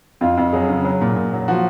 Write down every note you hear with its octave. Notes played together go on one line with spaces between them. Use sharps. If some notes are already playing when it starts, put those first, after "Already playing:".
F2 F4
F2
F#3 G#4
C#3
F#3
A#2
A#2
F#3
F3 F#4